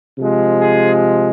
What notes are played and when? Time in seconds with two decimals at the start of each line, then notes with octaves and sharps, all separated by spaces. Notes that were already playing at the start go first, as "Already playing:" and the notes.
0.16 C3 F3 G#3
0.61 G#4